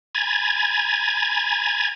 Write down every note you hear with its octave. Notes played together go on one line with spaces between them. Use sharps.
G#5 A#5 B5 G#6 A6